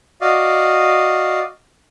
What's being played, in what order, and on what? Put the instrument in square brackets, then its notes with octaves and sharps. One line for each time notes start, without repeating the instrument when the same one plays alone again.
[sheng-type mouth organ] F#4 D5 D#5 F5